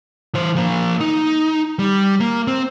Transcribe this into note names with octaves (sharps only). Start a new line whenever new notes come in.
E3 C5
F3 A#3
D#4
G3
A#3
C4